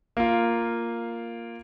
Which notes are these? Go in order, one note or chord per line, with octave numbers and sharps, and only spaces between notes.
A#3 F4